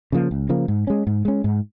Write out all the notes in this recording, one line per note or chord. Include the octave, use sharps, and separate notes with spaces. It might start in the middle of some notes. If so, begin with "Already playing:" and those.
C#3 F3 A#3
C#2
C#3 F3 A#3
G#2
G#3 C#4
G#2
G#3 C#4
G#2